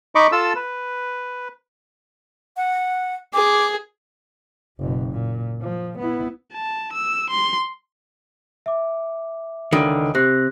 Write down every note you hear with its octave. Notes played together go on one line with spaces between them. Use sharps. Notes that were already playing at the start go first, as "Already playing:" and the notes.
D#4 D#5 B5 C#6 D6
F4 A4 A5 E6
B4
F#5
G#4 D6
F#1 B2
A#2
F3
B3 E4
A5
E6
C6
E5 D6
C#2 D3 D#3
C3 G4 F#6 A#6